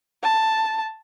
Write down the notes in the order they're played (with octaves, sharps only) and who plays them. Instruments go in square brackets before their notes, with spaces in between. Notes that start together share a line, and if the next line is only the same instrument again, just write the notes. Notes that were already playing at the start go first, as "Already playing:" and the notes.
[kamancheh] A5